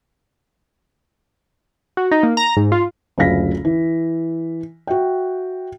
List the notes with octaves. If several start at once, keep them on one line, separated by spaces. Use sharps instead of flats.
F#4
D#4
A#3
A#5
G#2
F4
F#1 D2 F4 F5 A#6 B6
E3
F#4 E5 G5